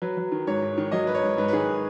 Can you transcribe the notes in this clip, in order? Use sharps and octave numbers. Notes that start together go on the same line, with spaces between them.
F#3 B4
F#3
D#3
G#2 C#5
G#2
D#3
F#3 D#5
F#3 B4
C#5
G#2
G#2 B4
B4
D#3 G#4